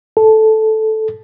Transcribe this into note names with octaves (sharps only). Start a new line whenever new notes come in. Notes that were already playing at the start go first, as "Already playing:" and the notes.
A4